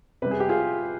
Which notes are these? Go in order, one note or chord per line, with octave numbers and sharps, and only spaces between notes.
C3 G3 B4
G#4
G4
F4 G#4